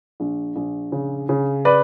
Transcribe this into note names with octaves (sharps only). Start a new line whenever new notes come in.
A#1
A#1
C#3
C#3
B4 D5